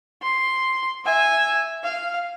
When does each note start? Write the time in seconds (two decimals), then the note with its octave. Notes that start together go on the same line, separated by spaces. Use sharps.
0.22 C6
1.05 E5 G#5
1.84 F5